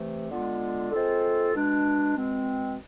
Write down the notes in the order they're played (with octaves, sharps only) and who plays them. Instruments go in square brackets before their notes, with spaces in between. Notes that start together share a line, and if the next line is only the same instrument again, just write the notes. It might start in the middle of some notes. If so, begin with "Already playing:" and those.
Already playing: [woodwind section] C3 E3 A3
D3 G#3 B3 F4
G#3 C4 F4 A4
B2 G#3 D4
B2 G#3 C4